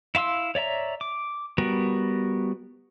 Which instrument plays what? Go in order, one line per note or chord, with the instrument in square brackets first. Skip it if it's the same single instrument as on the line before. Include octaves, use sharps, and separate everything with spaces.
[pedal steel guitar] E4 F5 C6 E6
C#5 D5 E5 A#5
D6
G3 B3 F#4 A#4